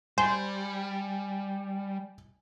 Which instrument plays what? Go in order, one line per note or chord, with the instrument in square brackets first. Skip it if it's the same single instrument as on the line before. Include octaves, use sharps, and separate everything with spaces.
[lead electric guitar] G3 [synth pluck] C5 [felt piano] G#5